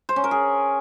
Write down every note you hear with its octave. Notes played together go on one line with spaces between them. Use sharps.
C5
C#4
A#4
G#4